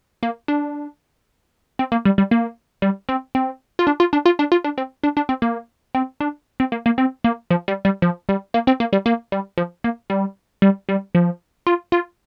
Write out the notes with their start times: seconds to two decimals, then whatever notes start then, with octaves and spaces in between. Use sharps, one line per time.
0.23 A#3
0.48 D4
1.79 C4
1.92 A#3
2.05 G3
2.18 G3
2.31 A#3
2.82 G3
3.09 C4
3.35 C4
3.79 F4
3.87 D4
4.00 F4
4.13 D4
4.26 F4
4.39 D4
4.52 F4
4.64 D4
4.78 C4
5.04 D4
5.17 D4
5.29 C4
5.42 A#3
5.95 C4
6.20 D4
6.60 C4
6.72 A#3
6.86 A#3
6.98 C4
7.24 A#3
7.51 F3
7.68 G3
7.85 G3
8.02 F3
8.29 G3
8.54 A#3
8.67 C4
8.80 A#3
8.93 G3
9.06 A#3
9.32 G3
9.58 F3
9.84 A#3
10.10 G3
10.62 G3
10.89 G3
11.15 F3
11.67 F4
11.92 F4